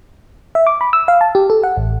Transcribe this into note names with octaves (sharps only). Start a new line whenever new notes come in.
E5
D6
B5
E6
F5
A5
G4
A4
F#5
A1